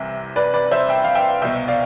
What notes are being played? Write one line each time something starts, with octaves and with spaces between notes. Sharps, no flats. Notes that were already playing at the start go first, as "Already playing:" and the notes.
Already playing: C2 C3 E3 E5
B4 D5
B4 D5
C5 E5
E5 G5
F5
E5 G5
C2 B2 E5 G5
D5 F5